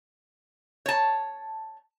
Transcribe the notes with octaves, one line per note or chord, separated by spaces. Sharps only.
C#5 A5